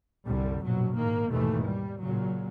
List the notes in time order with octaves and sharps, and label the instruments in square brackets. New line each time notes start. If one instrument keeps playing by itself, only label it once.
[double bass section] C2 F#2 D3 G3
A#1 B2 F#3
G#2 D#3 A#3
D#2 G#2 B2 D#3 E3 A3
G3
A#2 C#3 F#3